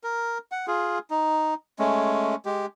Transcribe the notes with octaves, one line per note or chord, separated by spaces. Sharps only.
A#4
F#5
F4 G#4
D#4
G#3 A3 C#4
G#3 G4